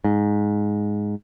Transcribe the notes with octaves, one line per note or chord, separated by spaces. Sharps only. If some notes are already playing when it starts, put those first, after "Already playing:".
G#2